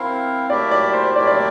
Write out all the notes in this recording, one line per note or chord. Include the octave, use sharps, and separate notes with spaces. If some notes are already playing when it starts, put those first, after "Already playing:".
Already playing: C4 E4 A#4 C5 F5
A3 E4 G4 A#4 D5 E5
D5
C5
A3 E4 G4 A#4 D5 E5
D5